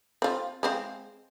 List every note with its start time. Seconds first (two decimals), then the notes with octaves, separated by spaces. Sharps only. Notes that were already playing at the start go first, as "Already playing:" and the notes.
0.22 C4 F4
0.63 G#3 C4 F5